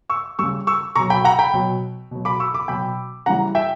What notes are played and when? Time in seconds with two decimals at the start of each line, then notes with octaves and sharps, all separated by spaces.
0.09 C#6 E6
0.39 C#3 G3 C#6 E6
0.67 C#6 E6
0.95 B2 F#3 A#5 C#6
1.10 G5 B5
1.24 F#5 A#5
1.39 G5 B5
1.54 B2 F#3
2.11 B2 F#3
2.25 B5 D6
2.40 C#6 E6
2.54 B5 D6
2.68 B2 F#3 G5 B5
3.26 C#3 E3 G3 F#5 A#5
3.55 E5 G5